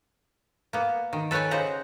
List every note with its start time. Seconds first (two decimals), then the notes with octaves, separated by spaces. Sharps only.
0.73 A#3 B3
1.13 D#3
1.31 A4 B4 C#5 G5 G#5
1.51 C#3 C5 D#5 F#5 A#5